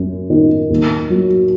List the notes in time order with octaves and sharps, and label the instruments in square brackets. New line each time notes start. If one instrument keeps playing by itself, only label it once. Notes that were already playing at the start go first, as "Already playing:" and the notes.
Already playing: [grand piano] F#2 F#3
D#3
D#2
F#3